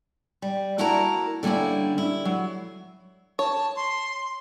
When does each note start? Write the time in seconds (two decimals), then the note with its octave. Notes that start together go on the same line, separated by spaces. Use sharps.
0.42 G3
0.78 A#3 E4 F#4 A#4 A5 A#5
1.43 D3 G3 A#3 C#4 E4
1.98 E4
2.25 F#3
3.39 C#5 A5
3.76 C6